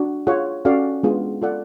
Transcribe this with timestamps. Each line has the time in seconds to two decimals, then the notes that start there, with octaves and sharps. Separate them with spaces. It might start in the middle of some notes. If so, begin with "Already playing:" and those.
Already playing: D4 F#4
0.27 F4 G#4 C#5 F#5
0.65 C#4 F#4 A4 D5 F5
1.03 G#3 B3 D4 F4 G#4
1.42 F4 A4 D5 F#5